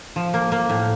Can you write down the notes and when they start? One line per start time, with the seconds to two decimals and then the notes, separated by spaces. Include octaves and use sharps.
0.16 F3
0.34 A#3
0.52 A#3
0.70 A2